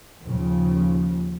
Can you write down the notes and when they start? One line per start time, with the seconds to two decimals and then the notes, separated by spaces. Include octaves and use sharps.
0.22 D#2 C#3 F3